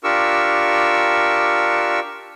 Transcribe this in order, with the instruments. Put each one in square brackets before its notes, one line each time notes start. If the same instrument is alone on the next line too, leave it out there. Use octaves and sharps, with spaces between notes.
[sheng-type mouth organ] D4 F4 G4 A#4 C#6 E6